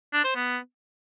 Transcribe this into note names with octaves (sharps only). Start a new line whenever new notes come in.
D4
C5
B3